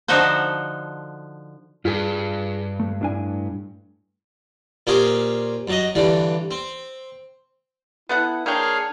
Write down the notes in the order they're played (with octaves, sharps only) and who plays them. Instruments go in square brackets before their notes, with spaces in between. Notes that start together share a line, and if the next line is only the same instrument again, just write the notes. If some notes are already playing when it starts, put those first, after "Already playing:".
[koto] D3 F3 D#4 F#4 A4 C5
[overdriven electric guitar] G2 [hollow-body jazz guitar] F4 G#4
[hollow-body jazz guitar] A3
A2 D4 G#5
[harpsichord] A#2 A#3 C4 C#4 G4 G#4
F#2 F#3 D#5
G2 D3 E3 D4
C4
[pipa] B3 A4 F#5 [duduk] E4
[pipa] A#3 A#4 G5 [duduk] D4 [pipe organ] G#4 C#5 F5